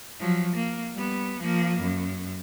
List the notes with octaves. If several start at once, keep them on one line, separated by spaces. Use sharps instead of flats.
F3 F#3
A#3
G3 B3
F3 A#3
F#2